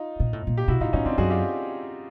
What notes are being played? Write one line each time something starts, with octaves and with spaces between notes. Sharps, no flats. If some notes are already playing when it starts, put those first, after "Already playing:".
Already playing: D#4 F4
A#2
A2
A#2
G4
B2 E4 F#4
A2 D#4 F4
A2 C#4 D#4
E2 C4 D4
F#2 F#4 G#4
F4 G4